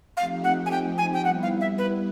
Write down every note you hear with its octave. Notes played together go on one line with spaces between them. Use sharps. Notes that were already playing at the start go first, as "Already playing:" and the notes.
F3 A3 C4 D#4 G4 F5
F#5
G#5
G5
G#5
G5
G3 B3 E4 F#5
F5
E5
B4